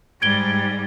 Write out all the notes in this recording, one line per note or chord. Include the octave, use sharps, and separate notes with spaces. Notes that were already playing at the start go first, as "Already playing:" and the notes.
G#2 G3 G#6 D7 G7